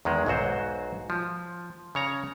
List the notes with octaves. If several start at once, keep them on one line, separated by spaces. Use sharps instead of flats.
E2 D#3 G#3
B1 G#2 F#3 F#4 C5
F3
C#3 C#5 A#5